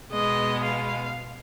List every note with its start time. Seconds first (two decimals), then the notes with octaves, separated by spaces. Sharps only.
0.12 B2 G#3 B3 D#5
0.63 F5